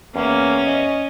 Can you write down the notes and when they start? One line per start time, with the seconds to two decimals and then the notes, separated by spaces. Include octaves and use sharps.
0.16 E2 A#3 C#4
0.65 D#5